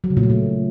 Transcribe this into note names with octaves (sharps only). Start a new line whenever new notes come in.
F#3
C#3
A#2
A3
A#2